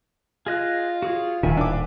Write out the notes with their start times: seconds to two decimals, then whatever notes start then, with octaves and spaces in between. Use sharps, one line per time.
0.47 F4 G#4 D#5 F#6
1.03 F#4 G#4 C#5
1.43 D#1 A2 D#3 E4 E5 G#5
1.57 D4 D6